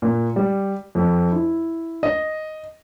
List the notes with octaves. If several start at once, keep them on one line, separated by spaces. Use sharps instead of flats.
A#2
G3
F2
E4
D#5